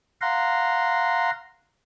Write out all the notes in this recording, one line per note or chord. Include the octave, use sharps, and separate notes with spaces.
F5 F#5 A#5 C6